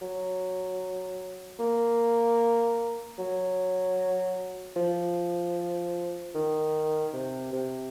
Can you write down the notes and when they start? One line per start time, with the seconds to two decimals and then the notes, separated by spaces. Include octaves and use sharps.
0.01 F#3
1.59 A#3
3.18 F#3
4.76 F3
6.34 D#3
7.13 C3
7.53 C3